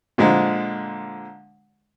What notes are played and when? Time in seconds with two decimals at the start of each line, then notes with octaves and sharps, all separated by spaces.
0.18 A#2 D3 F3 G#3